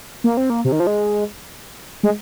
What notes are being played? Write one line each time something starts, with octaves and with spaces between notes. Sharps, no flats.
A#3
C4
A#3
C3
D#3
F3
G#3
G#3